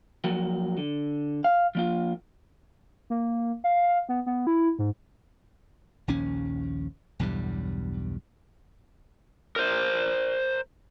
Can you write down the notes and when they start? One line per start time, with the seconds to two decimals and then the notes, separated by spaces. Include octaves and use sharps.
0.24 F3 F#3 A#3 F#4
0.77 D3
1.44 F5
1.75 F3 A#3 F4
3.10 A#3
3.64 F5
4.09 B3
4.26 B3
4.47 E4
4.79 G#2
6.08 A#1 D#2 C#4
7.19 B1 E2 G2 G3
9.56 A#4 C5